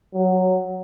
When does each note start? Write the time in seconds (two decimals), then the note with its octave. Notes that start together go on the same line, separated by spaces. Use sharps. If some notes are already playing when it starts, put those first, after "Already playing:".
0.14 F#3